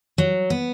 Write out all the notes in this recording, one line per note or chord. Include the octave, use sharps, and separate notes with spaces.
F#3
B3